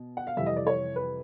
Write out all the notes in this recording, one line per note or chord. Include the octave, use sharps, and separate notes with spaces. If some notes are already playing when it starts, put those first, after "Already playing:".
Already playing: B2
F#5
F5
F2 C3 E3 G3 E5
D#5
D5
C#5
B4